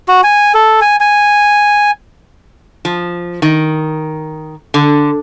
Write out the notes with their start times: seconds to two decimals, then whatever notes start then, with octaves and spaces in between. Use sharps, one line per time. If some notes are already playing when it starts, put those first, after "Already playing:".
0.08 F#4
0.23 G#5
0.54 A4
0.81 G#5
1.00 G#5
2.85 F3
3.42 D#3
4.74 D3